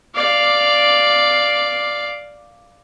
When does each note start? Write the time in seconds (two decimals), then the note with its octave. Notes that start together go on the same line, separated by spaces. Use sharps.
0.15 D5 F5